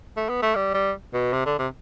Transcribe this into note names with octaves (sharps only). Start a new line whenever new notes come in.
A3
B3
A3
G3
G3
B2
C3
D3
C3